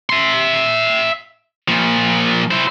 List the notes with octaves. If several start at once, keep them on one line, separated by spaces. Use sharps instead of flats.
E5 C6
A#2 F3
E4 C5